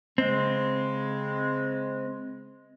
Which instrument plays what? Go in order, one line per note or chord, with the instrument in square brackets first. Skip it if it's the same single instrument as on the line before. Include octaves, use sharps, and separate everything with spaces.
[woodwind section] C#3 G#3 [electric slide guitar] C4